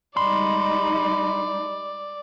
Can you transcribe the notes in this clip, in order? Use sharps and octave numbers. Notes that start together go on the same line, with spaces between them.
G3 G#3 D#4 D5 B5 C6